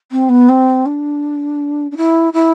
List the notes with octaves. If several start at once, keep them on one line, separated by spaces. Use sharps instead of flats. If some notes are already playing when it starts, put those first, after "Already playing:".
C4
B3
C4
D4
D4
E4
E4